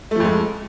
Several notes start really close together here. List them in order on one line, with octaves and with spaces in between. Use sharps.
A3 F3 F2 G#3